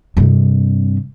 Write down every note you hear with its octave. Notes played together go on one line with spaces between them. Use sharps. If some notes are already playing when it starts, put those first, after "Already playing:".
G2 C3